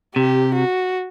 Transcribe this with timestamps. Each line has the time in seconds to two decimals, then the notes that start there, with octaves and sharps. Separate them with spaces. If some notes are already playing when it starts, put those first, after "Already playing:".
0.16 C3 G4
0.55 F#4